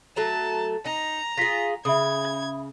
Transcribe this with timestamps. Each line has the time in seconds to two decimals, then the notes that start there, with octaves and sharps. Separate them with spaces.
0.16 F#3 A3 A5 A#5
0.86 D#4 A#5
1.38 F4 G#4 A#6 B6
1.85 C#3 E5 B5 D#6 G#6